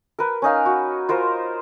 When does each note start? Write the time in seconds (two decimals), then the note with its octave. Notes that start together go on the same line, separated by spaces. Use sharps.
0.19 A#4 B4
0.42 C#4 D#4 F5
0.66 F#4
1.09 F4 A#4 C5